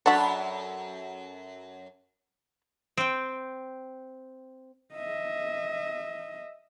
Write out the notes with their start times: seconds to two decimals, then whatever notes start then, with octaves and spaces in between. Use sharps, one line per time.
0.06 F#2 D4 F#4 A4 F#5 A5 B5
2.97 C4 G5
4.95 D#5 E5